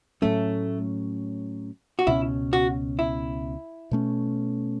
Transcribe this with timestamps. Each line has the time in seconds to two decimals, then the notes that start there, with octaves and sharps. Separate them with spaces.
0.22 A2 F#3 A3 C#4
1.99 F#4
2.07 C#2 B2 G#3 C#4 E4
2.53 F#4
2.99 E4
3.91 B2 A3 C#4